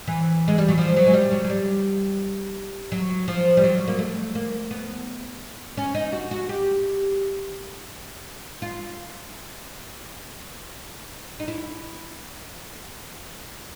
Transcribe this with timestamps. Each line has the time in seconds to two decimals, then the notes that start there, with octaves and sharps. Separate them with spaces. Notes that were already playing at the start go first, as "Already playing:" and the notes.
0.07 E3
0.48 G#3
0.58 G3
0.68 F#3
0.78 F3
0.96 F#3
1.07 G#3
1.13 G3
1.31 F#3
1.44 F#3
1.50 G3
2.92 F#3
3.28 F3
3.57 G3
3.64 F#3
3.88 A#3
3.99 A3
4.35 A#3
4.71 B3
5.77 C#4
5.95 D#4
6.13 F#4
6.31 F#4
6.49 G4
8.62 F4
11.40 D#4
11.48 E4